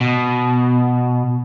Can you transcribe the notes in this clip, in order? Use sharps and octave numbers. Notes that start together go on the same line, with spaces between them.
B2